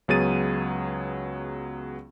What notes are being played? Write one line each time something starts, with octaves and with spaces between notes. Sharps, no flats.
C#2 F#3 B3 G#4 A6 D#7